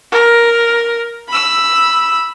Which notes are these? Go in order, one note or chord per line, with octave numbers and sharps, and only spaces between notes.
A#4
B5 E6